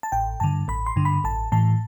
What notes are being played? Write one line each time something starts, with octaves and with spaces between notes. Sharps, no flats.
A5
A1 G5
G2 D3 A5
A1 B5
C6
G2 D3
B5
A1 A5
A2 E3 A5